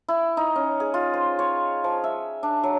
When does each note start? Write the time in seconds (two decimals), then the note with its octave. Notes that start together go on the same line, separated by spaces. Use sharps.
0.09 E4
0.37 D#4
0.56 C#4
0.80 G#4
0.94 F4
1.14 C5
1.39 C#5
1.84 F3
2.04 E5
2.43 D4
2.63 F#3